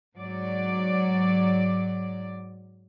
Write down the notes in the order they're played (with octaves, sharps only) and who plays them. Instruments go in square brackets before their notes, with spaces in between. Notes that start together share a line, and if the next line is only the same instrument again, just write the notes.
[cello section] G#2 F#3 D5